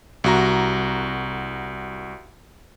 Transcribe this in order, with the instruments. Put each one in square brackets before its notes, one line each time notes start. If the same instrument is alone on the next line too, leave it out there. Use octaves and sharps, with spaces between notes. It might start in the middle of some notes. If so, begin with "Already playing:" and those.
[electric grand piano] C2 F#4 A#5